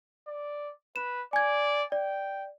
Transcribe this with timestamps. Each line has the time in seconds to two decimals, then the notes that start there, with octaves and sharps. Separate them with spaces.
0.27 D5
0.96 B4 E7
1.33 D5 G#5 G#6
1.92 D5 G5